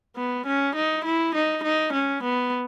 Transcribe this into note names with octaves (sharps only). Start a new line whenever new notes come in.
B3
C#4
D#4
E4
D#4
D#4
C#4
B3